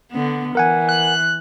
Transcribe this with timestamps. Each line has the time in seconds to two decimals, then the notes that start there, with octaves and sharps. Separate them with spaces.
0.11 D3 B3
0.55 E3 A#4 F#5 G#5
0.89 F#6